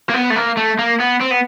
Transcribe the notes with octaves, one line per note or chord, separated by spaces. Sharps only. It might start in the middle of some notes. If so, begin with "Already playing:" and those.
A#3
B3
A3
A#3
A3
A#3
B3
C4
B3